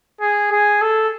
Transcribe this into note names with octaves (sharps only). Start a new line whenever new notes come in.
G#4
G#4
A4